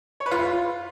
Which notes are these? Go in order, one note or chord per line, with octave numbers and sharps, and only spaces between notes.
C#5
B4
F4